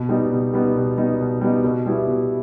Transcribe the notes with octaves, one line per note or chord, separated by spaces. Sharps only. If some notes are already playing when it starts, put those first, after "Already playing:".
Already playing: B2
G3 B3 D#4
B2
G3 B3 D#4
B2
G3 B3 D#4
B2
G3 B3 D#4
B2
G3 B3 E4 G4
B2